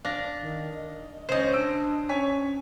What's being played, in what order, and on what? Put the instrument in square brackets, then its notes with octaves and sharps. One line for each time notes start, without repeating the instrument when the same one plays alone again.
[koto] D4 [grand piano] F5 A#6
[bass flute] D#3
D#5
[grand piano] C#2 C#4 [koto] C5 D#5
[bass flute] D4 [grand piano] E6 D7
[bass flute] C#4 [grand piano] C#5 G#5 B6